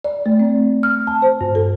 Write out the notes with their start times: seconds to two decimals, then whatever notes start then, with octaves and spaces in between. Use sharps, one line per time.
0.04 D5
0.26 A3
0.40 C4
0.83 F6
1.07 A5
1.22 C5
1.41 G2
1.55 A4